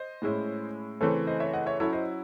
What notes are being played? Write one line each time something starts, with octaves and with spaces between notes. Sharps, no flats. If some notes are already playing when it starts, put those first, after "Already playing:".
Already playing: C5 D#5
A2 G#3 C#4 E4
C#3 E3 A3 C4 A4 C#5
C5 D#5
C#5 E5
D#5 F#5
C#5 E5
F#3 C#4 E4 A4 C#5
C5 D#5